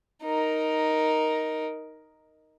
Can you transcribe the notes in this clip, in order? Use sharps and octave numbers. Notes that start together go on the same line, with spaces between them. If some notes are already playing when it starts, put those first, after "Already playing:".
D#4 A#4